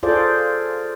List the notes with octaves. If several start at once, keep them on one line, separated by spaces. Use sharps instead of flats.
F4 G#4 A4 C5 D5